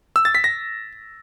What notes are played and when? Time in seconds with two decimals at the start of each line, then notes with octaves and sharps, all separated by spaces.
0.16 E6
0.25 A6
0.35 B6
0.44 A#6